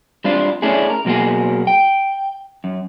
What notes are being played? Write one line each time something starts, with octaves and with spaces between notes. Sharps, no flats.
G3 C4 D4 F4
A3 C#4 D4 E4 G#4
A#4
B2 F#3 A#3 F#4 G#4
G5
F#2